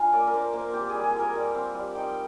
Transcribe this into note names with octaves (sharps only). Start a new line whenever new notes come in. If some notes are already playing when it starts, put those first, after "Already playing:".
Already playing: D4 F4 F5 G#5 A#5
A#3 D5
A#4
D4 C5
A#3 C5
C4 G4
G#4
G3
G#4
F4 A#4
G3
C4
G3
D#4 G5